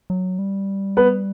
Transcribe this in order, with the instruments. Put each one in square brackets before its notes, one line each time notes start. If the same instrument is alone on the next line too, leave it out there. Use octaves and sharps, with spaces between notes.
[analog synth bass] F#3
G3
[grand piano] B3 B4